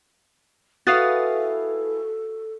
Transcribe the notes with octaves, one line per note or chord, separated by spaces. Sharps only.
E4 F#4 G#4 A4 B4 F5 D#6 A6